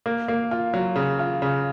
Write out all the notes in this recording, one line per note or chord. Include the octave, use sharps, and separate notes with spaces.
A#3
A#3
F4
F#3
C#3
F4
C#3